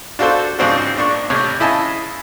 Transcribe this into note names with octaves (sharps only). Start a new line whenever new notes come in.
D4 F4 F#4 A4 C5
G#2 C#3 F3 C4 D4 F#4
A#1 D4 C#6
A1 C3 C#5
C#3 E4 D#5 G#5 A5